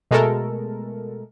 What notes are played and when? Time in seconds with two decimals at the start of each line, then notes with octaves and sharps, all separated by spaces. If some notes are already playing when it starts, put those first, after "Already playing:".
0.11 B2 G#3 A3 A4 A#4